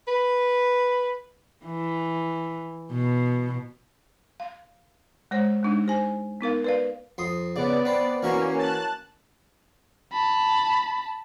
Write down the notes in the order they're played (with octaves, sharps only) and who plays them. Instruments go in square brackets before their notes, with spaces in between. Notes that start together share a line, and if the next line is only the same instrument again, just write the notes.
[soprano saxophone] B4
[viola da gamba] E3
B2
[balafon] F5
G#3 C5 C#5
G#3 D4 D#4
G4 C5 G#5
B3 D#4 A#4 F5
B4 D5 F5
[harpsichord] F2 C6 D#6
[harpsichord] C#3 [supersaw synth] B3 D5
[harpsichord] C4 B4
[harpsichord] E3 F#4 A#4 [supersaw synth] A#3 C#4
[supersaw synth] A5 F#6
[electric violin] A5 B5